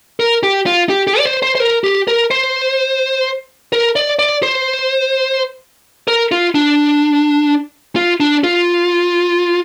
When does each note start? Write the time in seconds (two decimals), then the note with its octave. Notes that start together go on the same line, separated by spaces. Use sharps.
0.20 A#4
0.43 G4
0.66 F4
0.89 G4
1.07 G4
1.19 D5
1.25 C5
1.43 C5
1.55 C5
1.60 A#4
1.84 G4
2.08 A#4
2.31 C5
3.72 A#4
3.96 D5
4.19 D5
4.43 C5
6.08 A#4
6.31 F4
6.55 D4
7.96 F4
8.20 D4
8.44 F4